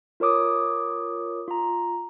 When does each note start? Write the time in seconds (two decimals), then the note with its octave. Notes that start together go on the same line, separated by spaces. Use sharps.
0.20 F4 A#4 C#5 D6 D#6
1.48 F4 A#5